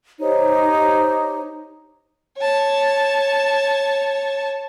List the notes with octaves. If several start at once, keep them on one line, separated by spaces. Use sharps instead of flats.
D#4 G4 C5 C#5
C#5 A5